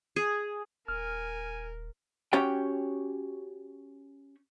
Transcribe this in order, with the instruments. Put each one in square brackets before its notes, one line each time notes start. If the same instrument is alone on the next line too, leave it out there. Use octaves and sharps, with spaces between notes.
[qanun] G#4
[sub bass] D#1 [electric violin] A#4 [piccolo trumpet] G#5 [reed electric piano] F6
[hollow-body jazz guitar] C#4 F#4 G4 C#5 G5